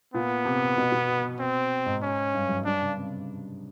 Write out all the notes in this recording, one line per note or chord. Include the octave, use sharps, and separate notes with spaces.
A#2 B3
C3
B2
B2
C4
G#2
C#4
G2
F#2
G#2
G2 D4
C#3
C3
C#3